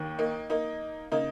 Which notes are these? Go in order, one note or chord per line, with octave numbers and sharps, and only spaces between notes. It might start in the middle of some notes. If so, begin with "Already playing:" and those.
Already playing: D#2 D#3
A#3 D#4
A#3 D#4
C#3 A#3 D#4